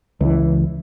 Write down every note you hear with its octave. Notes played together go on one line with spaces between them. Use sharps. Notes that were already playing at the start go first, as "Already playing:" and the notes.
C#2 E3